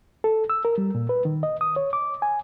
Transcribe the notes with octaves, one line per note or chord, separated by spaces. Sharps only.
A4
E6
A#4
G3
A#2
B4
D#3
D#5
D#6
C#5
D6
G#5